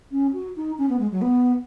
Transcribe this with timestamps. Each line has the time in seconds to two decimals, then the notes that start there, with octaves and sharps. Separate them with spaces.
0.11 C#4
0.33 F#4
0.56 D#4
0.78 C#4
0.89 B3
0.99 G#3
1.11 F#3
1.21 B3